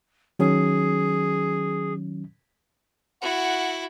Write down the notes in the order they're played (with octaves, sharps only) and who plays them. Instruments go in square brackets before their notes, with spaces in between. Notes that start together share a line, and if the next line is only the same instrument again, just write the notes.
[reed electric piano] D#3 F#3 C#4 [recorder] G#4
[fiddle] E4 F#4 [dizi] F#5